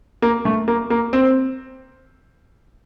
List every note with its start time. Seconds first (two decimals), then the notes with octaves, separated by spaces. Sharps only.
0.22 A#3
0.45 A3
0.68 A#3
0.90 A#3
1.13 C4